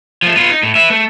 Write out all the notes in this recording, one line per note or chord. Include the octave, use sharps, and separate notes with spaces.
F3 A3
B3 F4
D#4
A2
B4 E5
A3